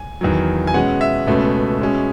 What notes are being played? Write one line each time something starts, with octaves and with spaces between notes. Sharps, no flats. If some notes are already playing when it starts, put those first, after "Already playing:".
Already playing: G#5
E2 D#3 F#3
G#5
B2 G#3 C#4 F#5
E5
C#2 B2 A3 C#4
B2 G#3 C#4